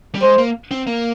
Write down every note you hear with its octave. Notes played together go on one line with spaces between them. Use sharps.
G3
G#3 C5
A#3
C4
A#3